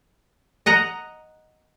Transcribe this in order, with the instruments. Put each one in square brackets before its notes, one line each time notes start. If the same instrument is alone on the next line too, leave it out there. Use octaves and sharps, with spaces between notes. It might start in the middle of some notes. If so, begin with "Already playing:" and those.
[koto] D#5 F#5 A#5